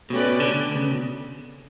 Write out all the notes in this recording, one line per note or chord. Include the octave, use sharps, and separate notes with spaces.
B2 A3 C#4 G4 B4 D5
B2
D3
D3
C#3
B2